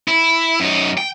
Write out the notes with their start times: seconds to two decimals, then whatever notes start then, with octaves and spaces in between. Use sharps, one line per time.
0.08 E4
0.60 F#2 D#4
0.98 G5